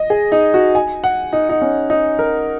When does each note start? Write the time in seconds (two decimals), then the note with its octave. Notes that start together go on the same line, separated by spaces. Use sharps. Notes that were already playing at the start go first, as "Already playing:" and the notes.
Already playing: D#5
0.10 G#4
0.32 D#4
0.54 F#4
0.75 G#5
1.04 F#5
1.33 D#4
1.49 D#4
1.61 C#4
1.90 D#4
2.19 A#4